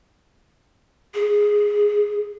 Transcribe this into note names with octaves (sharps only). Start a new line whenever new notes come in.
G#4